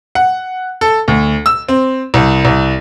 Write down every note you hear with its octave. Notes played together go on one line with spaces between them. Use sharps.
F#5
A4
D2
E6
C4
C2
C2